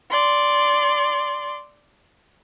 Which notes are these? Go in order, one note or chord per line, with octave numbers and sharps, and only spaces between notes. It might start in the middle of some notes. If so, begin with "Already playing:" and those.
D5 C6